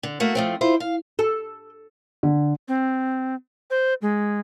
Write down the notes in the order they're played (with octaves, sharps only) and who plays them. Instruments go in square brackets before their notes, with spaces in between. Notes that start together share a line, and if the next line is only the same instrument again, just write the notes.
[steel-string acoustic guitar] D3
A3 A#3 F#4
F3 A3 C4
E4 F4 C5
F5
[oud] A4
[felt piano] D3
[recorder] C4
C5
G#3